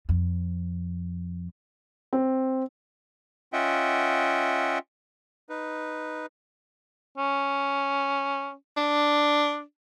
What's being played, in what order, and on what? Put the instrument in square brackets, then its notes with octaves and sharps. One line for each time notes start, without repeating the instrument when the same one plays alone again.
[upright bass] F2
[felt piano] C4
[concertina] C#4 F4 D#5 E5 F#5 G5
D#4 B4
[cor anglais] C#4
[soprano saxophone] D4